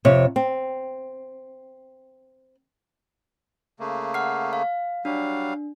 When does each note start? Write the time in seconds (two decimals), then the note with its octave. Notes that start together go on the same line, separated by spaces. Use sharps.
0.05 F2 C3 C#5
0.36 C4
3.80 C#3 A3 A#3
4.14 F#5 F6 C7
4.53 F5
5.05 F#3 G3 D4 F5